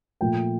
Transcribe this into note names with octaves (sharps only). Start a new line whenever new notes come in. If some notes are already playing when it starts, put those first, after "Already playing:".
A#2 F3 A3 G5